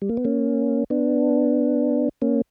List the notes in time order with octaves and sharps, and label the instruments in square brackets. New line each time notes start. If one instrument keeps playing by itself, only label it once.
[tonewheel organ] G3
A#3
B3
A#3 C#4
B3 D4
A#3 C#4